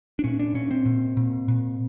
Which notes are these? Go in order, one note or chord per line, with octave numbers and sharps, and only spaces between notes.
D4
A#2 C#4
D4
A#2 C#4
C4
A#2
A#2
A#2